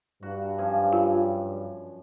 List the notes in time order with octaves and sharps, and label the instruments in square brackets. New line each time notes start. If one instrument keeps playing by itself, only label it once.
[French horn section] G2 [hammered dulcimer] F#4
[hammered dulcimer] F#2 F3 G#5
[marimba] F4